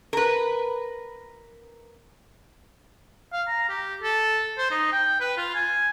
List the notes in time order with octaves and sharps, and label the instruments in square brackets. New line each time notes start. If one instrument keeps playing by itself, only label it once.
[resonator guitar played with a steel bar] A#4 B4
[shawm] F5
A#5
G4
A4
C5
D#4
G5
B4
F4
G#5